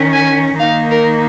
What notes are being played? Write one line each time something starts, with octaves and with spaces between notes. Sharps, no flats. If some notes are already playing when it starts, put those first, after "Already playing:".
Already playing: D#3 C#4
G#5
D#3 A#3 D#4 F5
A#4